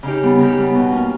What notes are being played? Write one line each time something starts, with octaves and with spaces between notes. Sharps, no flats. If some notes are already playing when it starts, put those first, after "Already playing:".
C#3 D#4 G4
G3 B3
C#3 D#4 G4
G3 B3
B2
A#3 C#4